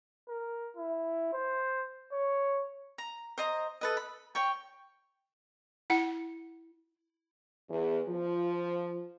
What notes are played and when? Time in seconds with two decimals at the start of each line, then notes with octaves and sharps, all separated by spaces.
0.29 A#4
0.77 E4
1.33 C5
2.13 C#5
2.98 A#5
3.38 C5 D#5 A#5
3.81 A4 B4 D#5
3.97 B5
4.35 C#5 G5 C#6
5.90 E4 F#5
7.70 E2
8.08 F3